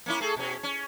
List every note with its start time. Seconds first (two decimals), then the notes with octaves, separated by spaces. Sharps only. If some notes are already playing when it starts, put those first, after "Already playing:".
0.06 A#3 C#4 E4
0.21 A3 G#4 A4
0.36 B2 C#4
0.63 C#4